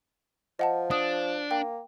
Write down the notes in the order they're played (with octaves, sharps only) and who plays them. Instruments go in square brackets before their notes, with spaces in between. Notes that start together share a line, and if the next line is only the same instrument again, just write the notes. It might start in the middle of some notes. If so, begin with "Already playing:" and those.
[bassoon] F3 [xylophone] D#5 F#5 A5
[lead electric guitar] D4 [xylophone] D#6
[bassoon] A#3 [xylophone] G5